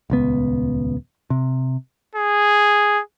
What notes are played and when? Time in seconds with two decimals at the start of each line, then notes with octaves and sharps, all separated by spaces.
0.10 D#1 C#2 B3
1.30 C3
2.15 G#4